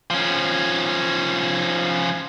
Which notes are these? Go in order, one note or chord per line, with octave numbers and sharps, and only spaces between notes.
F3 C#4